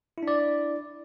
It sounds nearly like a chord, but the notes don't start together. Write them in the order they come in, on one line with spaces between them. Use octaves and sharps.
E4 D4 D5